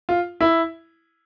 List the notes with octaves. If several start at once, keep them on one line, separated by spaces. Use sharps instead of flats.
F4
E4